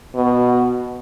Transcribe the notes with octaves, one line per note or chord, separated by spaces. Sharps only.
B2